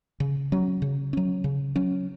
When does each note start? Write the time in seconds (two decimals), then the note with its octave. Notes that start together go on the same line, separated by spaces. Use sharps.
0.20 C#3
0.52 F#3 C#4
0.82 C#3
1.13 F#3 C#4
1.44 C#3
1.76 F#3 C#4